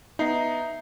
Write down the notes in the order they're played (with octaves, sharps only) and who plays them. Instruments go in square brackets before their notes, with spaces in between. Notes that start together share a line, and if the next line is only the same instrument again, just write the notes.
[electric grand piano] B3 D#4 [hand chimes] E5 A#5 C7